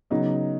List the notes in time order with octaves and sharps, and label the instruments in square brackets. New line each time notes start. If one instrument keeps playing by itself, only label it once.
[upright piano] C#3 F#3 B3 D#4